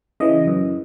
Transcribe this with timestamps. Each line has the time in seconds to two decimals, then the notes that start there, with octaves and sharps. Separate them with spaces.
0.20 C#3 E3 D#5
0.47 F#2